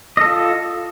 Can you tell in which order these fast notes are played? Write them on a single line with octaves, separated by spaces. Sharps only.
D#5 A4 F4